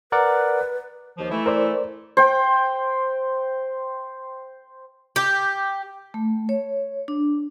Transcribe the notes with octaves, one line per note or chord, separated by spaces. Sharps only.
A#4 B4 D5 F#5
D#2 F3
E3 A3 E4
A#4 C5 D5
C5 G5
G4
A3
C#5
D4